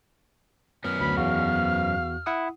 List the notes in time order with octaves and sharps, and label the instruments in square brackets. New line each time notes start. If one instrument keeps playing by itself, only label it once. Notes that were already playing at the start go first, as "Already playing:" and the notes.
[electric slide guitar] F#2 B3 [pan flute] F6
[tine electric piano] D2 [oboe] B5
[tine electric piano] E2 F#4 [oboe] F5
[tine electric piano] E4 F#5 D#6